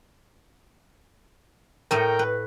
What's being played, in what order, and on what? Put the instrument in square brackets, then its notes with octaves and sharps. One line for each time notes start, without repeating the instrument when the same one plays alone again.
[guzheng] A2 A3 D#5 [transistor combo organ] A#4 G5
[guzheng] B4